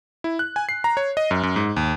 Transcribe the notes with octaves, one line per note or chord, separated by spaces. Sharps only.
E4
F#6
G#5
C7
A#5
C#5
D#5
F#2
F#2
G#2
D#2